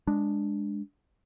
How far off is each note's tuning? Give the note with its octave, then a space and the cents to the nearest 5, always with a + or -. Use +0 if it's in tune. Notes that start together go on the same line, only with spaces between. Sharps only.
G#3 -10 D4 +0